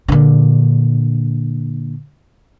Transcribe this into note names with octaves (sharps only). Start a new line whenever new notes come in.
A#2 D3